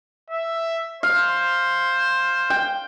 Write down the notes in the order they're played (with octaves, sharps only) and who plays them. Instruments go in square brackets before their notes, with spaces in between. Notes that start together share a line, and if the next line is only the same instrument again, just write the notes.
[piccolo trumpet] E5
[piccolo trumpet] C5 [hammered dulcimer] F5
[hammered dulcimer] G5